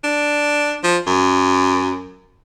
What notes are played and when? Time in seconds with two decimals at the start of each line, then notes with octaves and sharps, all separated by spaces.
0.04 D4
0.84 F3
1.07 F#2